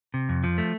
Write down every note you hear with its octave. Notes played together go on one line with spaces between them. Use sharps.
C3
F2
F3
A3